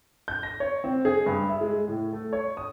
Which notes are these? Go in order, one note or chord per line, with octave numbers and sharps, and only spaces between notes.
G6
A#6
C#5
C4
G#4
G2
E5
G#3
A2
A3
C#5
D#6